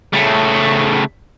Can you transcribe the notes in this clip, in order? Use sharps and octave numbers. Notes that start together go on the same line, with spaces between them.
C#3 A3